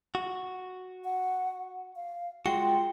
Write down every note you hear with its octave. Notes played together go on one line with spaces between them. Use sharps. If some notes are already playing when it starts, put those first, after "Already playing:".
F#4
F#5
F5
G#3 F4 F#4 G5